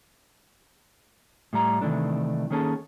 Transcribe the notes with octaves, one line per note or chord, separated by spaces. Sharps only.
A2 G3 A#5
C3 D#3 E3 A3 D4
D#3 A#3 C#4 G#4 A4